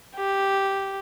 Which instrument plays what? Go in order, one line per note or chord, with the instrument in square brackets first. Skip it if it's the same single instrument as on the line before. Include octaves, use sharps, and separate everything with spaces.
[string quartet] G4